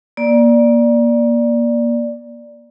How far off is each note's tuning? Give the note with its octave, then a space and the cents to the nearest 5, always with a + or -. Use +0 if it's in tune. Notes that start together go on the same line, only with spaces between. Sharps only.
A#3 +25 D5 +0